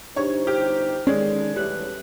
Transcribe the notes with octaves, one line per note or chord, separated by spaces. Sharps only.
G1 D4 D#4 G4 C5 C#5 C#6
G4 G5 F6
D#3 G#3 C#4 A4 C#5 D5
E2 A2 G3 B4 F#6 F#7